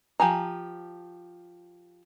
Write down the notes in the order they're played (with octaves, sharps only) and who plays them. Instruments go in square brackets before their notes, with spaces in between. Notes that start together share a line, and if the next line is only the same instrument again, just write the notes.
[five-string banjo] F3 G4 G#5 A#5